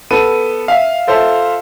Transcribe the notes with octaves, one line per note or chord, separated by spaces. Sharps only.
B3 A4 D#7
E5 F5
F4 A4 C5 E5 F5